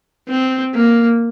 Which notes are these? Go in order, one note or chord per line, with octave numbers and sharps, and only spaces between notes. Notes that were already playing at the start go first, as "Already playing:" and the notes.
C4
A#3